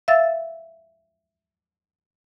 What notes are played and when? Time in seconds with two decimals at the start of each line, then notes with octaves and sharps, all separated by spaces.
0.08 E5 F5 E6 A6